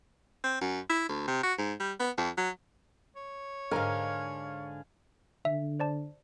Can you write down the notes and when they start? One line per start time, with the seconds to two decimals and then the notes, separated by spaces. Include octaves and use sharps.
0.44 C4
0.61 F#2
0.90 E4
1.09 D2
1.28 C3
1.43 F#4
1.59 G#2
1.80 G3
2.00 B3
2.18 F2
2.37 F#3
3.16 C#5
3.71 G#2 D3 D4 A#4 F5 G#5 A#5
5.45 D3 E5
5.80 C5 D5 A5